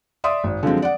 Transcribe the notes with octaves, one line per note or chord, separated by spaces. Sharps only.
D5 E5 C6 D#6
G#1
D3 F3 F#3 G#3 C4
D5 F#5